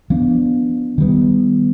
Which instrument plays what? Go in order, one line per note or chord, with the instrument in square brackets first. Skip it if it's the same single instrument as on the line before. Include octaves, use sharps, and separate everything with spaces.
[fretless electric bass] F3 B3 D4
D#3 G3 B3